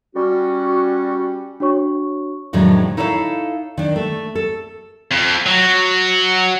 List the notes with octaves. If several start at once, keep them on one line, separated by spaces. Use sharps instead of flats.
G3 C#4 F#4
D4 F#4 C#5 C#6
F2 A2 D3 D#3 F#3 G#3
D#4 E4 A4 C#5 E5 F5
D#3 D4
A3
A4
F2
F#3